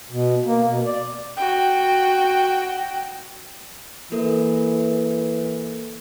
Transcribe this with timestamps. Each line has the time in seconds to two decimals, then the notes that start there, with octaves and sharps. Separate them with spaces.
0.11 B2
0.45 A#3
0.67 B2
0.86 D5
1.37 F#4 G5
4.12 E3 A#3 A4 A#4